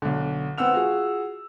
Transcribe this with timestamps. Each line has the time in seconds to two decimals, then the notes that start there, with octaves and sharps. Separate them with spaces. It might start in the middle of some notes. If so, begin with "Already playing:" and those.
0.02 B1 D3
0.58 B3 C4 F#5 E6 F7
0.73 F4 F#4 G#4